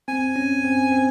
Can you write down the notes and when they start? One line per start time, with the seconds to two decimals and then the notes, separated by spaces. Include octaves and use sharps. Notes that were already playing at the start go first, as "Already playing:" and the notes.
0.08 C4 G#5
0.36 C#4
0.64 C4
0.92 C4